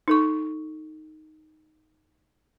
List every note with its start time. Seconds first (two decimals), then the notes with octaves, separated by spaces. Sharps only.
0.08 D#4 A4 C#6